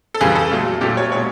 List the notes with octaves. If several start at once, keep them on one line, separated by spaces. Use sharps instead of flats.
A4
F2 C#3 E3 G3 G#4
A4
A#2 F#3 A3
A#2 F#3 A3 G4
C#5
B2 G#3 C#5